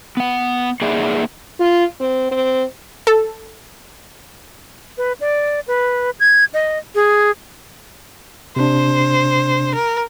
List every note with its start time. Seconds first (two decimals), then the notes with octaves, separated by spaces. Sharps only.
0.17 B3 F#5
0.81 A#3 D#4 G#4 D5 E5 F#5
1.60 F4
2.00 C4
2.31 C4
3.07 A4
4.98 B4
5.21 D5
5.68 B4
6.20 G#6
6.54 D#5
6.95 G#4
8.56 C3 D4 C5
9.75 A#4